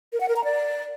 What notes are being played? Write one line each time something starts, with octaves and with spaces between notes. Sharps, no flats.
A#4
F#5
A#4
A#5
D5